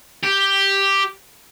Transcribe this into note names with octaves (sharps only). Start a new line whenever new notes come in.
G4